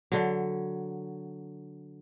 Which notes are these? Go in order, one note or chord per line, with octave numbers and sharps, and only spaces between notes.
D3 F#3